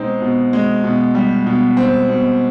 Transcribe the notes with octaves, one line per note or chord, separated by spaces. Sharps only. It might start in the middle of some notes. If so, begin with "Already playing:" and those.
Already playing: B2 G#3 C4 D#4
B2
G#3
B2
G3
B2
C4
B2